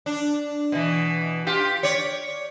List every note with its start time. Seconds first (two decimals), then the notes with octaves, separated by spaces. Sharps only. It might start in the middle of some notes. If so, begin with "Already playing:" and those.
0.06 D4
0.72 B2 E3
1.47 F4 G4
1.83 C#5 D5